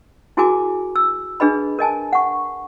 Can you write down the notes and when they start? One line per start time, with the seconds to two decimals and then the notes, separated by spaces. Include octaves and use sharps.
0.37 E4 F#4 G#4 A#4 G#5 D6
0.96 E6
1.40 D4 G#4 B4 D#5 B5
1.79 A#4 D#5 G#5 A5
2.13 F#5 C#6